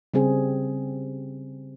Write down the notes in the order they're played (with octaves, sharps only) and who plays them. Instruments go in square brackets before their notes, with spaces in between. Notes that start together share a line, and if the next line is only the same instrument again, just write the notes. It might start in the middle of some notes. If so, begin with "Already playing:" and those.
[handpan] C#3 G3 C4 G#4